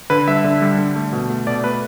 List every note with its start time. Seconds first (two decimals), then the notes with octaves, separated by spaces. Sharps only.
0.10 D3 B4
0.28 G3 E5
0.44 D3
0.62 G3
0.79 D3
0.96 A3
1.13 B2
1.30 A3
1.47 B2 D5
1.64 A3 B4